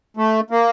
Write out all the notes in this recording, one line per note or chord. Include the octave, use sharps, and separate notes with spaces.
A3
A#3